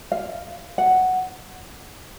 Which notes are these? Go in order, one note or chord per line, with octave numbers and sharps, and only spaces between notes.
F5
F#5